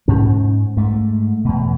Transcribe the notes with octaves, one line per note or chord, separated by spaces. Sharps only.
G#2 C#4
G#2 A3
E2 B2